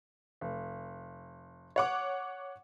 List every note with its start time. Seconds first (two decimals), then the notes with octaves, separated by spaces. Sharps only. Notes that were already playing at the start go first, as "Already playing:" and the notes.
0.41 F1
1.76 C#5 F#5 D6